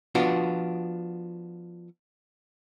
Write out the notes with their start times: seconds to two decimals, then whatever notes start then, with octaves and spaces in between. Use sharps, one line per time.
0.15 F3 B3 D4 F4 F#4